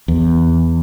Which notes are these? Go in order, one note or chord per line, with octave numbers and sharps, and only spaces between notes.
E2